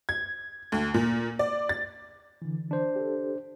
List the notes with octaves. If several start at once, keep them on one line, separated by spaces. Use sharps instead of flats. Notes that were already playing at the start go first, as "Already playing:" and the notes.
G#6
D2
A#2
D5
A6
D3 E3
D4 C5
G4 A4